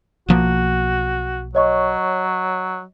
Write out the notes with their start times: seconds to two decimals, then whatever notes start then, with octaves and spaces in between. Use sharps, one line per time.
0.28 B1 F3 A#3 F#4
1.55 F#3 C#5 D#5 C#6